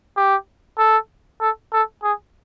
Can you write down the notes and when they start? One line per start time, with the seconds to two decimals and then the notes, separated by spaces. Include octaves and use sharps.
0.17 G4
0.79 A4
1.41 A4
1.73 A4
2.03 G#4